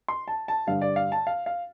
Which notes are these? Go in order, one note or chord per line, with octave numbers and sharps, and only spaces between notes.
C6
A5
A5
G2 D3 G3 F5
D5
F5
A5
F5
F5